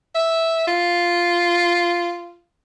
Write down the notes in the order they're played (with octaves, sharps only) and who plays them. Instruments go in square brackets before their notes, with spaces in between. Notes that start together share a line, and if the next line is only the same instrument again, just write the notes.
[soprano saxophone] E5
F4